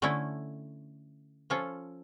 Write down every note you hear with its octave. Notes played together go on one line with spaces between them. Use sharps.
D3 A3 C#4 E4
F3 C#4 F4 A4